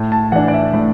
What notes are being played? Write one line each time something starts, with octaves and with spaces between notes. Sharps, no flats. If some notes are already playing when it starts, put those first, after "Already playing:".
Already playing: A2
A5
E3 D4 F#5
D5
E5
A2